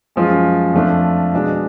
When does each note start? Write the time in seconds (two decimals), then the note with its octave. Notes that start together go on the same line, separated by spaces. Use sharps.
0.16 F#2 F3 G#3 C#4 F4
0.74 F2 F3 A3 D4 F4
1.33 B2 G#3 D4